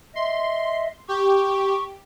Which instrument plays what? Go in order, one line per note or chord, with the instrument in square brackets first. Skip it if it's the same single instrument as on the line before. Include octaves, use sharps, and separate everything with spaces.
[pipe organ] D#5 E5 [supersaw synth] C6
[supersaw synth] G4 [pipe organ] C#6